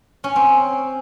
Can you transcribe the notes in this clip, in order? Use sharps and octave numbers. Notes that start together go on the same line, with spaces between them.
C#4
C4